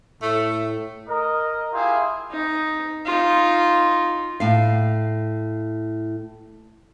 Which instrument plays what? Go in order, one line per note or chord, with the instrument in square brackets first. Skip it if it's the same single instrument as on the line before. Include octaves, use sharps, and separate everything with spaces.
[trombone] A2 [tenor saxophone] A3
[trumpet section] A#4 D#5
E4 F4 G4 G#4 E5 F5
[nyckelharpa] D#4
D#4 F4
[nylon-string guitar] A2 F5